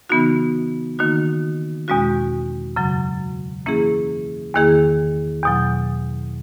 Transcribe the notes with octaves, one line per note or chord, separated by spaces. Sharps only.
C#3 E3 B3 D#4 F#4
D#3 A#3 D#4 F#4
E2 B2 G#3 C#4 F#4
F#2 C#3 F#3
E3 A#3 C#4 E4 G#4
E2 D#3 A#3 E4 G#4
E2 B2 F#3